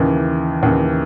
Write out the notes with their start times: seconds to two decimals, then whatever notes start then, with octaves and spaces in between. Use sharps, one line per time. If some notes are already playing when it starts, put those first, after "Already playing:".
Already playing: D#2 C#3 E3
0.63 D#2 C#3 E3